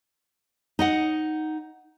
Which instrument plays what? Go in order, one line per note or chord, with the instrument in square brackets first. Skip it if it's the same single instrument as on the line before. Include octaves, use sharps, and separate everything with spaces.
[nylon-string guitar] D#4 D#5 F#5